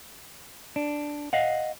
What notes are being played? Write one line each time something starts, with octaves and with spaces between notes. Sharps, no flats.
D4
D#5 F5 F#5